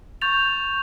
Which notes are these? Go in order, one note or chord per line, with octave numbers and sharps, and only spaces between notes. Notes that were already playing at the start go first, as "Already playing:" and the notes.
C#6 G6 A6 F7